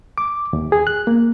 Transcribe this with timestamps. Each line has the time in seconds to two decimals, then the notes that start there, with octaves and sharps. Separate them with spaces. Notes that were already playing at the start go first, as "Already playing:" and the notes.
0.18 D6
0.53 D#2
0.72 G#4
0.87 F#6
1.07 A#3